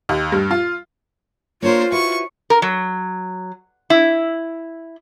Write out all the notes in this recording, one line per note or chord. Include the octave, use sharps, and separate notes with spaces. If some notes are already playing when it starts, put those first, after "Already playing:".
D#2
G2
F4
A#3 D4 F4 A#4 C5 C#5
E4 F#4 B4 C#6
A#4
F#3
E4